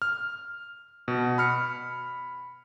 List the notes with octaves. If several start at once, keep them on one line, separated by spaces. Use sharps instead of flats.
F6
B2
B5 F6 C#7